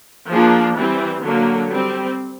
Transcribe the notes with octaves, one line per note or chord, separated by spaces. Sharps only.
F3 A#3 D4 G#4
E3 G3 C4
D3 F#3 A#3
G3 C4